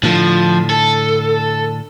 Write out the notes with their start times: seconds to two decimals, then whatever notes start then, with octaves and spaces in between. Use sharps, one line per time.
0.03 A2 D3 F3
0.70 A4